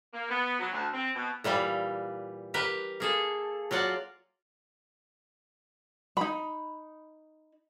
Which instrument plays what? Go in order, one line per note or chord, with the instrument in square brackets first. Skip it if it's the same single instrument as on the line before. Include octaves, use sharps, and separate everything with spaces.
[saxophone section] A#3
B3
F#3
D2
C4
B2
[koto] A#2 E3 G3 F5
G4 A#4 B4
A#3 G#4 A4
F#3 F4 D5 F#5
[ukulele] D#4 B5